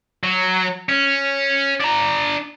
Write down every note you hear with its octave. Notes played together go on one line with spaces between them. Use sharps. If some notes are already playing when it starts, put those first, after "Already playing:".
F#3
C#4
D4 A#5